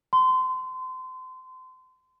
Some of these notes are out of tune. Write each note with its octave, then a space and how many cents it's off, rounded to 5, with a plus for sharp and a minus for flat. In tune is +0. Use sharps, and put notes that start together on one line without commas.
C6 -30